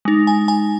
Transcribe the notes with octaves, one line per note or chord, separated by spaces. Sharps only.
G#3 D#4
G#5
G#5